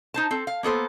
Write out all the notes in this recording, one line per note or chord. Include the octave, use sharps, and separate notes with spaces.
D#4 C5 A5
C4 A4
F5
A#3 B3 A4 C5